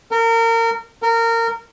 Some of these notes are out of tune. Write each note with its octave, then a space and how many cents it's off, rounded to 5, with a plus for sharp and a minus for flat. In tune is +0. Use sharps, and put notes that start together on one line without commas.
A#4 -30
A#4 -25